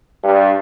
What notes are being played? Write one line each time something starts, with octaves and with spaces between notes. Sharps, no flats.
G2